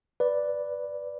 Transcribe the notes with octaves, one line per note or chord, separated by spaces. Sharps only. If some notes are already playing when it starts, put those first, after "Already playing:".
B4 D5